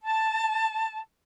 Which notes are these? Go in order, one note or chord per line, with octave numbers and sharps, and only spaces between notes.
A5